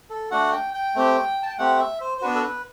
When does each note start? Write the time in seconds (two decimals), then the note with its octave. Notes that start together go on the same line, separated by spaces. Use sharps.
0.10 A4
0.31 A3 D4 F#4 F#5
0.52 G5
0.74 G5
0.95 A3 C4 G4
1.43 A5
1.50 G5
1.58 A3 C4 G4 F#5
1.79 E5
2.00 C5
2.18 C5
2.22 B3 D4 F#4 B4
2.35 A4
2.43 B4